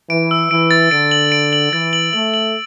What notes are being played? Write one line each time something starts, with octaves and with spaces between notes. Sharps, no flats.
E3 D7
E6
E3 D7
A6
D3 D7
F#7
D7
F#7
E3 A6
F#7
A3 F#7
F#7